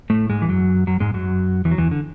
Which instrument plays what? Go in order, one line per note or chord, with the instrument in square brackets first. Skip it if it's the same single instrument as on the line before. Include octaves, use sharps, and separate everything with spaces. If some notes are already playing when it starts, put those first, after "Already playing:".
[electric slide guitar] A2 A3
G#2 G#3
E3
F#2 F#3
F#2 F#3
G#2 G#3
F#2 F#3
E2 E3
F#3
E2 E3
D3